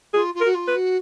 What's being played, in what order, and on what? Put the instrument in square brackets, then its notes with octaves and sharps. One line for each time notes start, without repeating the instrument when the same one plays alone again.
[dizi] F4 [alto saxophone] G#4
[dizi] F4
[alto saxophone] A#4
[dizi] F#4
F4
[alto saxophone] B4
[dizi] F#4